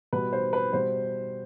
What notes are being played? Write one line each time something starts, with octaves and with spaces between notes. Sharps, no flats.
B2 G3 B4
C5
B4
B2 G3 C5